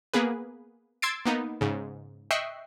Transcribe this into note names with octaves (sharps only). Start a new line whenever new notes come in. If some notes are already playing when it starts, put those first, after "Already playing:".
A#3 B3 G#4 B4
C6 E6 G#6 A6 C7 D7
A#3 B3 D#4
G#2 C#3
D#5 E5 G5 C#6 F#6 C7